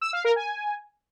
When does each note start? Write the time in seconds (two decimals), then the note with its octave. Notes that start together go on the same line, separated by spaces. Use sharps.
0.01 E6
0.13 F5
0.24 A#4
0.36 G#5